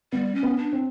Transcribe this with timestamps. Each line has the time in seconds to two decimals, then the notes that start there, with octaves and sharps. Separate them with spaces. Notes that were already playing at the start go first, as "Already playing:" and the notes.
0.12 G3 B3
0.35 C#4
0.43 B3
0.58 D4
0.73 C4